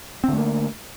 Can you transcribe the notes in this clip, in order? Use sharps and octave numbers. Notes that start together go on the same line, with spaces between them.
D3 A3 A#3 C4